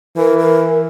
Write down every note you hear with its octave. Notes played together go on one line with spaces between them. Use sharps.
E3 A#4
A#4